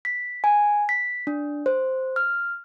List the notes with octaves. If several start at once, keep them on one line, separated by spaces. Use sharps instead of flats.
B6
G#5
B6
D4
C5
F6